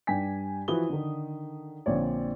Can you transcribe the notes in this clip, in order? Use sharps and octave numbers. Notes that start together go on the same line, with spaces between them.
G2 D4 G5 G#5 B6
E3 F3 F#4 B4 D#6 G7
D3 D#3
A#1 D3 C4 C#5 D5